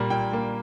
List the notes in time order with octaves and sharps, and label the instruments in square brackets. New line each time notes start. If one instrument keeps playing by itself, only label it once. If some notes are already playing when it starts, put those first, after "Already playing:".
Already playing: [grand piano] A#2 G3 A#3
A#2 G5
G3 A#3